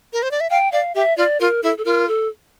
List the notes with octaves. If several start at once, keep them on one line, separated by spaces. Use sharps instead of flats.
A#4
C5
D5
E5
F5 G5
D5 F5
G4 E5
F4 D5
F4 A#4
E4 A4
A4
F4 A#4
A4